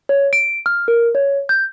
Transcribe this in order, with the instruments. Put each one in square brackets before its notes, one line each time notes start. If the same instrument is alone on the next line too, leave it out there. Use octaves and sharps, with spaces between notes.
[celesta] C#5
D7
F6
A#4
C#5
G6